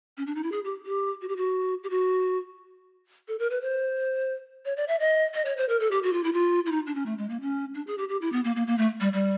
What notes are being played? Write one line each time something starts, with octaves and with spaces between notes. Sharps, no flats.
C#4
D4
D#4
E4
G#4
G4
G4
F#4
G4
F#4
G4
F#4
A4
A#4
B4
C5
C#5
D5
E5
D#5
D#5
C#5
C5
A#4
A4
G4
F#4
F4
E4
F4
E4
D#4
D4
C#4
A3
G#3
A#3
C#4
D4
G#4
G4
G4
E4
B3
A#3
A#3
A#3
A3
G3
G3